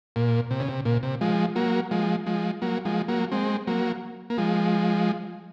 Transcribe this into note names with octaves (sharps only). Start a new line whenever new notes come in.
A#2
C3
C#3
C3
A#2
C3
F3 G#3
F#3 A#3
F3 G#3
F3 G#3
F#3 A#3
F3 G#3
F#3 A#3
G#3 C4
F#3 A#3
A#3
F3 G#3